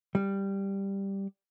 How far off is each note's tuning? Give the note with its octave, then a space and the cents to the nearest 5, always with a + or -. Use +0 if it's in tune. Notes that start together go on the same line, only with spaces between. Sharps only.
G3 +5